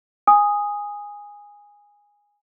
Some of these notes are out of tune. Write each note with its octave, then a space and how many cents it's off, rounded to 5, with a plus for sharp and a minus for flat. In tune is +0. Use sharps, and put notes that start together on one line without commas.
G#5 -15 D#6 +0